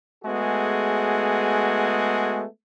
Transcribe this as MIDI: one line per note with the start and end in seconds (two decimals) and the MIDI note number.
0.24 2.45 56
0.24 2.45 57
0.24 2.45 59
0.24 2.45 66
0.24 2.45 68